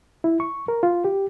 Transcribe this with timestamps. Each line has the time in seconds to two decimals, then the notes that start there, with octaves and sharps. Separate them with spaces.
0.24 E4
0.40 C#6
0.68 A#4
0.83 F4
1.04 G4